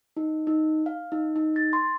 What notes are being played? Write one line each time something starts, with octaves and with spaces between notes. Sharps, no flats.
D#4
D#4
F5
D#4
D#4
A6
C6